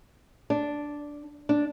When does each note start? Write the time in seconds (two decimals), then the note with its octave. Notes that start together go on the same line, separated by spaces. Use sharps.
0.50 D4
1.49 D4